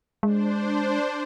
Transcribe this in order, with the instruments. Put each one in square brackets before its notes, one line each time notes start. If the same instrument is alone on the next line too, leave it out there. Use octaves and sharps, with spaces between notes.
[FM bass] G#3 [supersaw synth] D4 C5